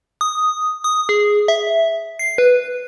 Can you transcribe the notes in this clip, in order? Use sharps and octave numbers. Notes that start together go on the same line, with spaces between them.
D#6
D#6
G#4
E5
C7
B4